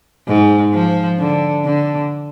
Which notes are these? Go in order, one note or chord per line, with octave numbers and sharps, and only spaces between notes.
G#2
F3
D3
D3